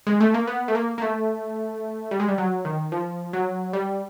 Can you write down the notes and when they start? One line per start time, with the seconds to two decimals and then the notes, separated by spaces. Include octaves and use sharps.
0.07 G#3
0.20 A3
0.34 A#3
0.47 B3
0.68 A3
0.75 A#3
0.98 A#3
1.02 A3
2.11 G3
2.20 G#3
2.28 G3
2.38 F#3
2.65 D#3
2.92 F3
3.33 F#3
3.73 G3